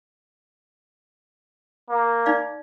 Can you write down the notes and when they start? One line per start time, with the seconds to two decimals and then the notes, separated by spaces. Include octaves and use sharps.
1.90 A#3
2.26 D#4 D5 F5